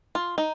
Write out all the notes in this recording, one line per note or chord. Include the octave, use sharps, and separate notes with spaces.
F4
D#4